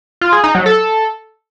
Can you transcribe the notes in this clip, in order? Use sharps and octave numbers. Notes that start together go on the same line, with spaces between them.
F4
G#4
D#4
F#3
A4